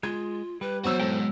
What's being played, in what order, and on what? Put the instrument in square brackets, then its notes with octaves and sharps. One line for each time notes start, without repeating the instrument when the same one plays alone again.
[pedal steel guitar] G#3 [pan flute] F4 [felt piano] G#6
[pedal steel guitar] G3 [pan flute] B4
[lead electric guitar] E2 F#4 [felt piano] B2 F#3 E6 [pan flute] C5
[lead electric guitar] G#2 [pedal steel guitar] E3 A4 G5